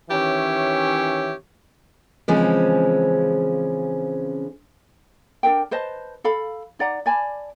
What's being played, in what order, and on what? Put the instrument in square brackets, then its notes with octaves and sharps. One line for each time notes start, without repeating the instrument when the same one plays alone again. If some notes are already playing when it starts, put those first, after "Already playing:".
[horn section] D#3 E3 C#4 G4 C#5 E5
[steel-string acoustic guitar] C#3 E3 F3 G#3 C4 C#4
[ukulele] D4 G#4 A#4 G5
B4 C5 D#5 A5
A4 F5 B5
D#4 D5 F#5 A#5
D5 G#5 A5 B5